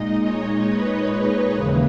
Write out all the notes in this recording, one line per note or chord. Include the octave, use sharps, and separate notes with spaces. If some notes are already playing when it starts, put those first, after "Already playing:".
Already playing: A#2 G#3 D#4 D#5
C#5
B4
D#2 C#3 E3 A#3